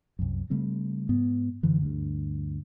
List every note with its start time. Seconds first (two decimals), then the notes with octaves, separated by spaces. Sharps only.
0.19 C2 F#2
0.50 C#3 G3 A3 C4
1.09 G#2 B3
1.63 F#2 D3 E3
1.82 D2 G2